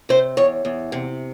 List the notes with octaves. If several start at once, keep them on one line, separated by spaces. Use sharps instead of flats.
C3 C5
E2 C#5
E2
C3